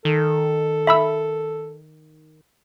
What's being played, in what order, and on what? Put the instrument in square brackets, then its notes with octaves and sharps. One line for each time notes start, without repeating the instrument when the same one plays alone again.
[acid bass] D#3 [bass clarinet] A4
[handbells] E5 B5 E6